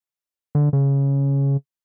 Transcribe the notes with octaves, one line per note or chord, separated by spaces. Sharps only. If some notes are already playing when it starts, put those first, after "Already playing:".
D3
C#3